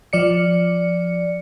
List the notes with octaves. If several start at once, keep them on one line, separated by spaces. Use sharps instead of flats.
F3 D5 C#7